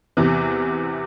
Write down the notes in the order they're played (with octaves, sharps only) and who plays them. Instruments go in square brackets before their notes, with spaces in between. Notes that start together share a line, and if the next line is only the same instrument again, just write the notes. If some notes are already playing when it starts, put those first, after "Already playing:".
[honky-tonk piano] E2 C3 E3